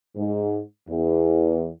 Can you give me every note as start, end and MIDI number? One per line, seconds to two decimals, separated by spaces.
0.16 0.59 44
0.87 1.70 40